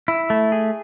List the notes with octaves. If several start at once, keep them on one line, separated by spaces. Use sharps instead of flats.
E4
A3
G#4